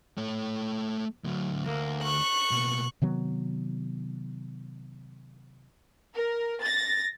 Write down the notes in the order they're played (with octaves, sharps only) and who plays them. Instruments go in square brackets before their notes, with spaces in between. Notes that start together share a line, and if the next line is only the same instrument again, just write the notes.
[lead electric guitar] A3 C#5
D2 F#3
[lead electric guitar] D2 [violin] A#3
[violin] C#6 F#6
[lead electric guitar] B2 A#3
[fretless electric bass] C3 D#3 F#3 B3
[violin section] A#4
A6 A#6